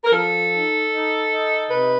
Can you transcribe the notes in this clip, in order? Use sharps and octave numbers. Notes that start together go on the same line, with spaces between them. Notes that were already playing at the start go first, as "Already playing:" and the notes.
A#4
F3 A4
D#4
D#4
D#4
C3 B4